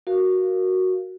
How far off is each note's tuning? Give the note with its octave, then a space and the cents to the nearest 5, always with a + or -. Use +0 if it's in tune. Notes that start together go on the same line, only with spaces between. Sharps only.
F#4 +0 A#4 +0 F5 -15